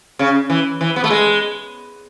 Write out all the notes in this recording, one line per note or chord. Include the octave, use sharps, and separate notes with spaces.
C#3
E3
E3
B3
A3
G#3